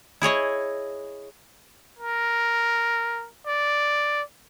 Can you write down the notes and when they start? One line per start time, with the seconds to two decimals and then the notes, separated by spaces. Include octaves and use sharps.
0.22 E4 G#4 C#5 D#5
1.99 A#4
3.47 D5